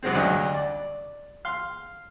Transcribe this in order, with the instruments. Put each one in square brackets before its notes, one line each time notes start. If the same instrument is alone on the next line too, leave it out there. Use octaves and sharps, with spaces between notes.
[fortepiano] F#2 C3 F#3 G#3 C4
D2 G2 F#3 G3 D4 D#5
D5
F5 C6